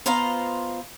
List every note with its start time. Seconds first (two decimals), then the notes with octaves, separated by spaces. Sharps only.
0.06 B3 F4 C5 D#5 F5 A#5